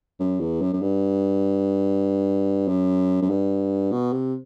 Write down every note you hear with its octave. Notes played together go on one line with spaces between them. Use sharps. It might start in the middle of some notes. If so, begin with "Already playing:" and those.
F#2
E2
F#2
F#2
G2
F#2
F#2
G2
B2
C3